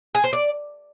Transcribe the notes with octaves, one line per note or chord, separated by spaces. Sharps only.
G#4
C5
D5